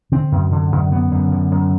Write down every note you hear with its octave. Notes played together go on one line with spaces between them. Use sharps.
D3 C4
F#2
D3
F#2
D3 B3
F#2
D3
F#2